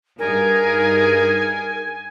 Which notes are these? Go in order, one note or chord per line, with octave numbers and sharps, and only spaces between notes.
G2 D#4 G#4 A#4 G#5